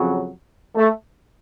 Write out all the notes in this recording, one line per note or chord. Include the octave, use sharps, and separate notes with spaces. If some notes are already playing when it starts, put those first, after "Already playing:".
Already playing: F2 C#3 F#3
A3